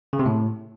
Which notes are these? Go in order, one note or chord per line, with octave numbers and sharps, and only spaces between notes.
C#3
C3
A2